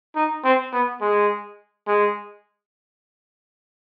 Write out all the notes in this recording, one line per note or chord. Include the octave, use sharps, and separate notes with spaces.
D#4
C4
B3
G#3
G#3